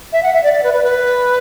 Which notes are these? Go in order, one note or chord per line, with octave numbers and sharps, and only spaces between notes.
E5
F#5
E5
D5
D5
B4
B4
B4